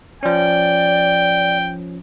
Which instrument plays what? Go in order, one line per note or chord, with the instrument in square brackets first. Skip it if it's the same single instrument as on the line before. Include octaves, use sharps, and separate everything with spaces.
[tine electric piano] F3 C#4 [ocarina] D5 [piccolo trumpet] G5